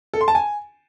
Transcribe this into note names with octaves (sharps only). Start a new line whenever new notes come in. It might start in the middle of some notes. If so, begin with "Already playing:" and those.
A4
C6
A5
G#5